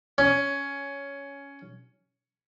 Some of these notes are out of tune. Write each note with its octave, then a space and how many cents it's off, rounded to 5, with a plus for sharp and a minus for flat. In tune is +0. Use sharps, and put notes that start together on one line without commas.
C#4 +10